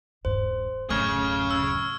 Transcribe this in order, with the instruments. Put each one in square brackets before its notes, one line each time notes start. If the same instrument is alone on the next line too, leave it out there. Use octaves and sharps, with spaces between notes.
[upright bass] D#1 G2 [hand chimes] C5
[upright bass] D1 F#2 [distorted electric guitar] C#3 G#4 [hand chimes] A3 [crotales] C#6 F6 G#6
[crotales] E6